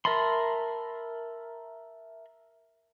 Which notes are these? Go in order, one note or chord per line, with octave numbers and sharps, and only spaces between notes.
A#4 E5 A5 B5 C6